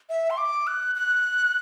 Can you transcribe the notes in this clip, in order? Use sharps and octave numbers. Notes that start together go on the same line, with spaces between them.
E5
C6
D6
F#6
F#6